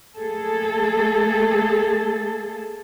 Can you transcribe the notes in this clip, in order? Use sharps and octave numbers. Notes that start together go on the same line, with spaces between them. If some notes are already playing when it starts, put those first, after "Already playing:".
A3 A#3 G#4 A4